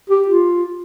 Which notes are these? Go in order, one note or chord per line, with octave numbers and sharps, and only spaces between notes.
G4
F4